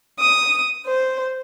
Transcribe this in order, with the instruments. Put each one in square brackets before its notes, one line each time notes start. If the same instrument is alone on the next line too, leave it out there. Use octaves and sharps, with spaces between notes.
[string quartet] D#6
C5